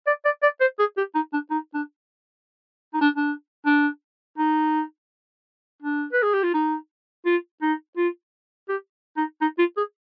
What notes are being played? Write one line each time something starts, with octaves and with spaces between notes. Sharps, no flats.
D5
D5
D5
C5
G#4
G4
D#4
D4
D#4
D4
D#4
D4
D4
D4
D#4
D4
B4
G#4
G4
F4
D#4
F4
D#4
F4
G4
D#4
D#4
F4
G#4